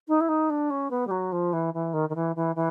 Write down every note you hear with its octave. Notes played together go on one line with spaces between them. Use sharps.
D#4
E4
D#4
D4
C#4
B3
G3
F#3
F3
E3
E3
D#3
D#3
E3
E3
E3